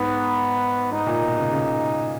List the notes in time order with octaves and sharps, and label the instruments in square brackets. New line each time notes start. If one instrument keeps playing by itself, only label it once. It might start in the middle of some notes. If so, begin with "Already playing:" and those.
Already playing: [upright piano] G#2 [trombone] B3
[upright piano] G#2 [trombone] D#4
[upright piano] A#2
B2
C#3
C#3